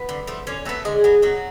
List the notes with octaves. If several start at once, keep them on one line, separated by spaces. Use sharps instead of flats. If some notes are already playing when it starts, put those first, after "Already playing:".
Already playing: B3 B4
D3
F3 A3
D3 C#4 C#5
F#3 A3 B3 A4
D3 G#3 G#4
F#3 B3
B2 F#3 F#4